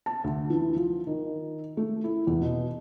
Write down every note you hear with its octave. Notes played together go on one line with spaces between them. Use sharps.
A5
D2
E3
F3
D#3
A3
E4
E2
B2